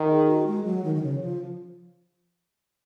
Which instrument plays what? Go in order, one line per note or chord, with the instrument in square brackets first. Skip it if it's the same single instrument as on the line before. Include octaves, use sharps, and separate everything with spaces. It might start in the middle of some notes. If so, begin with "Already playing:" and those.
Already playing: [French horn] D#3
[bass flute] G#4
F#4
G#3
F#3
D#3
D#3
C#3
F3